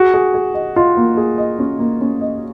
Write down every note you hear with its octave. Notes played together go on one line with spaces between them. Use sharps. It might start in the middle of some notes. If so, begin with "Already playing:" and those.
Already playing: F#4 G#4
G#4
G#4
D#5
F4 D#5
A#3
G#4
D#5
C#4
A#3
C#4
D#5